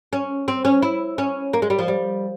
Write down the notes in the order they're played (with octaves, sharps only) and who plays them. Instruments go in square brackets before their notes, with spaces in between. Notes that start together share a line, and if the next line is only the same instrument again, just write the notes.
[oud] C#4
C4
C#4
E4
C#4
A#3
G#3
G3
F3
G3